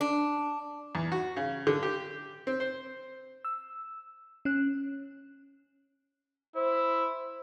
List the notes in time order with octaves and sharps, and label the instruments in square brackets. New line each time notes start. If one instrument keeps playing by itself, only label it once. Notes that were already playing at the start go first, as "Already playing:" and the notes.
[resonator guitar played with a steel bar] D4
[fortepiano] E2
F#4
C#3
D3
G4
C4
C5
[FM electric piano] E6
C#4 F#6
[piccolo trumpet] E4 [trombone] C5